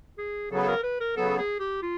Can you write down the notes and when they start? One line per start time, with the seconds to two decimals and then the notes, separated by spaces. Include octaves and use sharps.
0.18 G#4
0.51 C#3 F#3 B3 A4
0.62 A4
0.68 A#4
0.84 B4
1.01 A#4
1.17 C#3 F#3 B3 A4
1.38 G#4
1.60 G4
1.83 F4